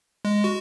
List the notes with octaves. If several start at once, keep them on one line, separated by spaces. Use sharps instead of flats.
G#3
F#4